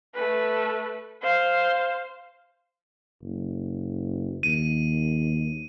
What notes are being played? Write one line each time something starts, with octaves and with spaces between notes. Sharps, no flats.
A3 B4
C5 F5
F#1
D#2 D#7